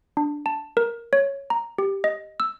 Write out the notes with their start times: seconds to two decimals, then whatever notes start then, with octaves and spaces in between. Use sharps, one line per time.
0.17 D4
0.46 A5
0.77 A#4
1.13 C#5
1.50 A#5
1.78 G4
2.04 D#5
2.40 E6